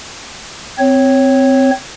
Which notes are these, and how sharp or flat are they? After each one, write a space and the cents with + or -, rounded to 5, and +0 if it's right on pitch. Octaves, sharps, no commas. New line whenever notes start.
C4 -10 C#5 -10